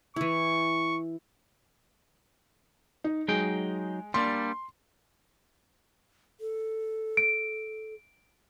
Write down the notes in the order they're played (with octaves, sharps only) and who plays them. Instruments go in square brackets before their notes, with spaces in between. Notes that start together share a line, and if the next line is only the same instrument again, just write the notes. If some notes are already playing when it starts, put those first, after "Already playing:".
[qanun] E3 E4 [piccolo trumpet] C#6
[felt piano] D#4
[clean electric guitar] F#3 D#4 G5 [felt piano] G#3
[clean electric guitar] G3 A#3 D4 [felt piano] C6
[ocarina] A4
[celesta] D7